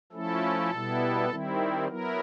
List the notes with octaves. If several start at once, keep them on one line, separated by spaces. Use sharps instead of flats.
F3 A3 C#4 E4 A4
B2 G3 B3 E4
D#3 G3 C4 E4
F#3 B3 E4 A#4